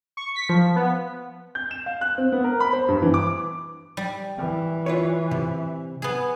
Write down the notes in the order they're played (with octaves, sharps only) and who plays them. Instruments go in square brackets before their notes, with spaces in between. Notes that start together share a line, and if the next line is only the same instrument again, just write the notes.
[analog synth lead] C#6
B6
F3
B3
[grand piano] G6
E7
F5
F#6
C4
B3
A#4
B5
C5
G2
E3
D6
[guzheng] G3
[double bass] E3
[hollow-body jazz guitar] F4 B4 C#5
C3
[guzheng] B3 G#4